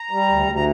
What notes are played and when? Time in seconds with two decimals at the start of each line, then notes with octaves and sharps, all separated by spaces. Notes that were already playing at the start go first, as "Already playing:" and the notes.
Already playing: A#5
0.11 G3
0.29 D2
0.47 D2
0.55 A#5